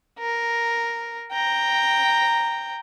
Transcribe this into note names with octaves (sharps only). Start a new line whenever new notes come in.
A#4
G5 A#5